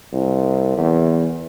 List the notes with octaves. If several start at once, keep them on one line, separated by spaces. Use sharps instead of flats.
C2
E2